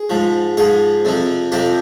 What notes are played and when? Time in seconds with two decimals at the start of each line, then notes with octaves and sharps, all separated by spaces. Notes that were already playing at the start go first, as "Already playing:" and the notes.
Already playing: G#4
0.10 G#2 F3
0.57 G#2 F3 G#4
1.05 F2 C3 F3
1.52 F2 C3 F3 G4